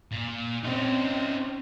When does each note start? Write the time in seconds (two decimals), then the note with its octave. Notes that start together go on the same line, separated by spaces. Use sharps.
0.11 A#2
0.64 C4 C#4 D#4